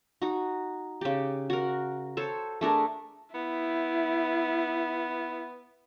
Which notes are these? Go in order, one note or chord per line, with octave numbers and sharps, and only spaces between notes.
D#4 F#4
C#3 G4
F#4 A#4
A4 C5 C#5
A3 D4 G#4 A#4
B3 E4